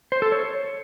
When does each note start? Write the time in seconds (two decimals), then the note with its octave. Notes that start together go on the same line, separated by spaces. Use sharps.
0.12 C5
0.22 A4
0.32 C#5